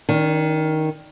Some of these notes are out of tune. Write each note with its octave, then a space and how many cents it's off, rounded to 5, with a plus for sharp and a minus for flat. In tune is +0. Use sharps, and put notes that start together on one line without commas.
D#3 +10 D4 -40 D5 +0